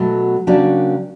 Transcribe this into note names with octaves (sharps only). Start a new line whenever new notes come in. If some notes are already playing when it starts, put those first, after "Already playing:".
Already playing: B2 F#3 A3
C#3 F#3 A#3 D4 G4